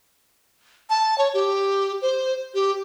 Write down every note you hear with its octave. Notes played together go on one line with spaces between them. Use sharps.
A5
C#5
G4
C5
G4